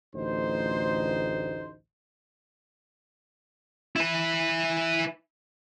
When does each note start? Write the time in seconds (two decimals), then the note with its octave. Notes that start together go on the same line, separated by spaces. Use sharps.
0.14 A1 D2 D#4 C5
3.96 E4 B4